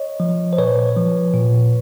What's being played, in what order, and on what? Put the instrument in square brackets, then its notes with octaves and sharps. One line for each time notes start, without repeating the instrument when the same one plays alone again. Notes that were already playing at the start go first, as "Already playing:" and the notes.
Already playing: [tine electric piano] C#5 D#5
F3
C5
A#2 B4 C#5
F3
A#2